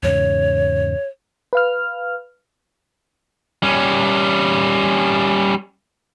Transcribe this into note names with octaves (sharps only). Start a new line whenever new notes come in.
E2 G#2 C#3 C#5
B4 F5 F6
G3 C#4